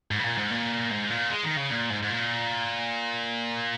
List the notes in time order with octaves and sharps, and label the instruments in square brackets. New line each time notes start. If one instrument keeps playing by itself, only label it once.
[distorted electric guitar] G#2
C#3
A#2
G#2
A#2
G#2
A#2
G#3
D#3
C#3
A#2
G#2
G#2
A#2